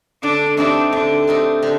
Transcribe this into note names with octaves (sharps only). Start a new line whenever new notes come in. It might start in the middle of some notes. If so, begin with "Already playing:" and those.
D3 D4
A3 C4 D4 D#4 G4
D3 D4
A3 C4 D#4 G4
D3